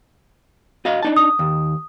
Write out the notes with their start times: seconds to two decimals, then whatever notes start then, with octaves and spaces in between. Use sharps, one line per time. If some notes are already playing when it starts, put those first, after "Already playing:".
0.85 F#4 D#5 F5
1.03 D4 D#4 A5
1.17 D#6
1.39 D#2